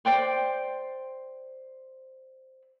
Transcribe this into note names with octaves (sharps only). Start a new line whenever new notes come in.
C5 D5 G5 C6